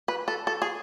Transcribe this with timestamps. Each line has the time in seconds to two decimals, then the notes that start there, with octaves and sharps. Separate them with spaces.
0.08 B4
0.28 A4
0.47 A4
0.62 G#4